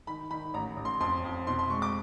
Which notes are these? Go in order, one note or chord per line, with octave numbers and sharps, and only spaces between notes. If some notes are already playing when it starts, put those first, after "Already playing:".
D#3 B5
D#3 B5
A1 A#5
A1
C6
F2 C6
F2
B2 C6
C6
G#3 C#6
D6